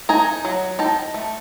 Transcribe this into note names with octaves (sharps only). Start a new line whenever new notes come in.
D#4 G#5 A#5
F#3
D#4 G5 A5
A3